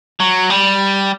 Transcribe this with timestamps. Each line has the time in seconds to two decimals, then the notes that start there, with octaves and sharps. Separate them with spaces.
0.20 F#3
0.50 G3